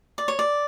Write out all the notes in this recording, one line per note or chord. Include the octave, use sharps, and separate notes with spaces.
D5
C#5
D5